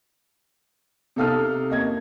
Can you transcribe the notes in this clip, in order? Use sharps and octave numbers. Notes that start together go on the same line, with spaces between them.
C3 D#4 A4 F5 D#6 F6
A#3 D#5 G#6